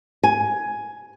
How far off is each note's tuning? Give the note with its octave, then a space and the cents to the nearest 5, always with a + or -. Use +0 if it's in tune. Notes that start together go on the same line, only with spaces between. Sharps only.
G#5 +10